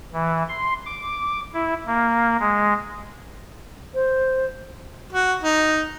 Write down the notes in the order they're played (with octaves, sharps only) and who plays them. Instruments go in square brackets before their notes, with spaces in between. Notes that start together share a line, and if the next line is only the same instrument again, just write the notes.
[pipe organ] E3
C6
D6
E4
A#3
G#3
[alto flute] C5
[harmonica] F#4
D#4